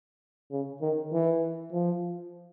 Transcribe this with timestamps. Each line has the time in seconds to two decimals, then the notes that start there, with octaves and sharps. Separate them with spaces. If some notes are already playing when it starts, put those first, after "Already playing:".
0.51 C#3
0.81 D#3
1.12 E3
1.72 F3